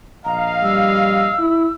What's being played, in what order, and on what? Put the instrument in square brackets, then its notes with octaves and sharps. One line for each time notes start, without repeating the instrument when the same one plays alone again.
[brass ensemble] A#1 D#5 F5 [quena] A#5
[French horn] G3 [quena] E6
[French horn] E4